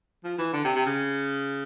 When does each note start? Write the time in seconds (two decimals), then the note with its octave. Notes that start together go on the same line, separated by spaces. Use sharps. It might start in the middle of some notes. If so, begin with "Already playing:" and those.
0.25 F3
0.38 E3
0.53 D3
0.64 C3
0.75 C3
0.86 C#3